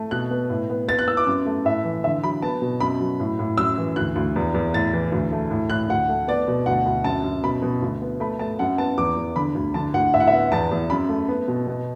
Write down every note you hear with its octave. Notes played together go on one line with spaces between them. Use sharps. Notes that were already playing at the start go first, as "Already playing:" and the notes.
Already playing: A3
B2 F#6
B3
A2
B3
B3 A6
F#6
B3 E6
D6
F#2
A3
A2 E5
E3
D3 E5
F#3 B5
B3 A5
B2
F#2 B5
F#3
A2
A2
F#2 E6
E3
D2 F#6
D2
E2
E2
A2 A6
E3
D2
A3
A2
A2 F#6
D2 F#5
A3
B3 D5
B2
D2 F#5
D2
F#2 A5
F#2
B2 B5
B2
D2
B3
A3 B5
A3 A5
F#2 F#5
B3 A5
E2 D6
E2
D3 B5
D2
D3 A5
D2 F#5
A2 E5
F#5
E5
B3
E2 A5
E2
F#2 B5
A3
B3
B2
B2